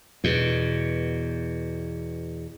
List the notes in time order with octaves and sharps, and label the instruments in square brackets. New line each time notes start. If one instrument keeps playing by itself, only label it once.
[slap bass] E2 B2